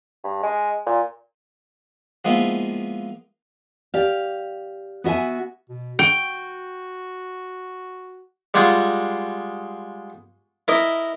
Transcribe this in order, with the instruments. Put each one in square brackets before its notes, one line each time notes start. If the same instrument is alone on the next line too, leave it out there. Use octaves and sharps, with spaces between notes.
[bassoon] G2
G#3
A#2
[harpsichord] F3 G#3 A#3 B3 D#4 E4
[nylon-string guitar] G4 D5 F5
B3 F#4 E5 G#5
[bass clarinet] B2
[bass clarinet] F#4 [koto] G5
[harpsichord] G3 G#3 F4 F#4 G#4
E4 A#4 D#5